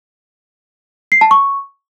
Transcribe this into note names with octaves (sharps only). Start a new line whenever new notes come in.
C7
A5
C#6